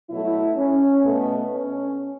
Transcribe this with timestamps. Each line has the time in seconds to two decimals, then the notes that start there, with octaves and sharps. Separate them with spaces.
0.10 B2 F#3 A3 E4
0.57 C#4
1.03 B2 A3 B3
1.51 C#4